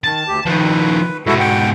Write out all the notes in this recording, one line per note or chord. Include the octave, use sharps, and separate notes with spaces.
D#3 A5
D2 G4
D#3 F3 B4
G#2 B2 E4 F#4 A4
F#5 G5